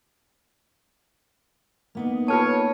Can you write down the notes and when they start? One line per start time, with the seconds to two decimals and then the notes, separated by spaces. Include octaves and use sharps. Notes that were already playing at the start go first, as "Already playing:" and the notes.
1.95 A#3 B3 D#4
2.28 F4 B4 C#5 A5